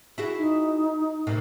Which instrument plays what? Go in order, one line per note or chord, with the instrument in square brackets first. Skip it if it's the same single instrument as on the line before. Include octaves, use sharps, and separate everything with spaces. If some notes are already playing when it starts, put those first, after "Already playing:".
[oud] E4 F#4 G#4
[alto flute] D#4
[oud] A2 C3 A#3